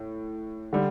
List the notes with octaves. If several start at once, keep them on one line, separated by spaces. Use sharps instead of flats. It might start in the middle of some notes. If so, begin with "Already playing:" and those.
Already playing: A2
D3 G3